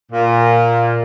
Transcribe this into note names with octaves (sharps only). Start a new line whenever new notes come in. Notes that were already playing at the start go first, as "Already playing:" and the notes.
A#2